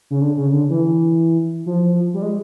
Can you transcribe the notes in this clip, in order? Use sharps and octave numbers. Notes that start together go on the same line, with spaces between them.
C#3
D3
C#3
D3
E3
F3
G3
G#3